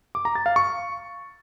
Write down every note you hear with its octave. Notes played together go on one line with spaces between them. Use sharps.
D6
A#5
A6
F5
C#6